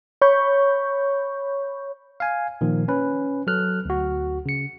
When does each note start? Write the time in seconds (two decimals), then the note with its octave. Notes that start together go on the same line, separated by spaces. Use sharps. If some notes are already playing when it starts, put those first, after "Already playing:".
0.22 C#5 B5 C#6 G6
2.20 F5 G#5
2.61 A#2 D#3 F3
2.88 C#4 B4
3.47 F#3 A4 F6 F#6
3.85 D2 F#4
4.46 C#3 C#7